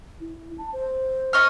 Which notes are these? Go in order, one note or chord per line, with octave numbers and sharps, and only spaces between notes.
E4
A5
C5
D#5 C#6 F6